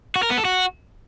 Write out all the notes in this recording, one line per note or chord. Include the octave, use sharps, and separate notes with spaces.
F#4
A#4
B3
A4
F#4